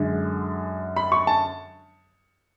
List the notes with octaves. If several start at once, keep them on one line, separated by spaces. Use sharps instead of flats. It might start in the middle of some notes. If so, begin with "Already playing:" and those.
Already playing: F#2 D3 G#3
B5
C#6
A5